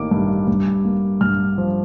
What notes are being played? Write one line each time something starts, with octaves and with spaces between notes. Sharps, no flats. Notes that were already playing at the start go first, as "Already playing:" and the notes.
Already playing: A1 D#3 A#3 D6
G2
G2
A#3
G2 F6
F3